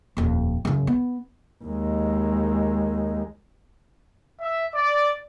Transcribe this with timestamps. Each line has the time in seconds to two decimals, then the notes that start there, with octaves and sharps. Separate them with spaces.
0.17 D#1 F2
0.65 F#2 C#3
0.87 B3
1.64 D#2 G#3
4.41 E5
4.74 D5